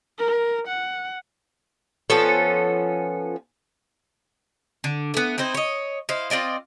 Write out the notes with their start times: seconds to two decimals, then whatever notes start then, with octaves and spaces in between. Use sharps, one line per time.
0.19 A#4
0.68 F#5
2.10 F3 B3 C#4 A4
4.84 D3
5.14 A3 B3
5.38 C4 D#4 E4 C5
5.54 C#5 D#5
6.09 E4 C5 D#5 F5
6.30 C4 F4 D5 D#5